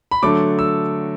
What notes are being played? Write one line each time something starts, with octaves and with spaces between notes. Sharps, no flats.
B5
D3 F#3 A3 D6
E6